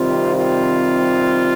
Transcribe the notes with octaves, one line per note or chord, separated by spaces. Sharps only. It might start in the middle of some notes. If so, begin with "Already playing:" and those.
Already playing: C3 D#3 G3 C4 F4
F4